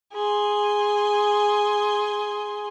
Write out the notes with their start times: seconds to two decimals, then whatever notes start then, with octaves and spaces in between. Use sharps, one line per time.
0.13 G#4 C6